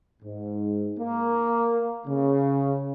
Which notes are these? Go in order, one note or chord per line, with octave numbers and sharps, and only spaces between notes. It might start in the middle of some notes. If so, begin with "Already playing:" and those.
G#2
A#3
C#3